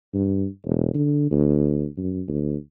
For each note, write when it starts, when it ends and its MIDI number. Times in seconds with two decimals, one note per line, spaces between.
0.14 0.47 43
0.65 0.93 28
0.94 1.31 50
1.31 1.87 38
1.97 2.22 42
2.28 2.55 38